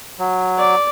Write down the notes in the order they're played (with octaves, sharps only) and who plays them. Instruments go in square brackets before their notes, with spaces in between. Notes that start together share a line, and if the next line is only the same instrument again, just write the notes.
[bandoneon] F#3
[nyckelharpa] D5